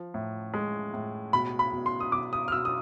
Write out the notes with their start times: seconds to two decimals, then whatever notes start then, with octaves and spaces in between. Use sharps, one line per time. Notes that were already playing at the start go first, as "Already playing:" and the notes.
Already playing: F3
0.14 A2
0.54 G#3
0.94 A2
1.33 B2 B5
1.59 B5
1.73 B2
1.86 C6
2.00 D#6
2.12 B2 D6
2.33 D#6
2.48 F6
2.52 B2 E6
2.65 D#6